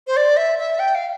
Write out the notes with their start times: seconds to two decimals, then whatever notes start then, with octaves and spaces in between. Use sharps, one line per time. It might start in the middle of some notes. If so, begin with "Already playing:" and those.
0.07 C5
0.17 D5
0.37 E5
0.59 E5
0.79 G5
0.95 F5